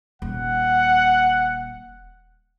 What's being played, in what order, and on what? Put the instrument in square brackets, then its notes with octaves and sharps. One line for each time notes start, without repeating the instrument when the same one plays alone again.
[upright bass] D#1 [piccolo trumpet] F#5